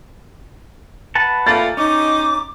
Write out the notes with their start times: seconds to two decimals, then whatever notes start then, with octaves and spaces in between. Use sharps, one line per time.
1.15 B4 F#5 A5
1.47 A#2 A3 A#3 A6
1.77 C#4 D#4 D6